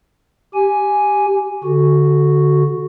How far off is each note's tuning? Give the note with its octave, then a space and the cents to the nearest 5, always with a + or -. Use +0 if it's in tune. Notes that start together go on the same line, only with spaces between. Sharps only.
G4 -5 G#5 +0
D3 -15 F#4 +0